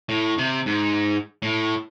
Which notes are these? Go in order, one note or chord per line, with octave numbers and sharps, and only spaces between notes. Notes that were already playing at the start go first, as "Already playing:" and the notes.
A2
C3
G#2
A2